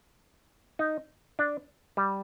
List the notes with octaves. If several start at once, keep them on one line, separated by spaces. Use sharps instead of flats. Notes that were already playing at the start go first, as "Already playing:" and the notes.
D#4
D4
G3